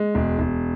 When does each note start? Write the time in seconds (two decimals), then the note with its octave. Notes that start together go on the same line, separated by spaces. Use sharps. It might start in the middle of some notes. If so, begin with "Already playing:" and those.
Already playing: G#3
0.15 E1
0.39 E1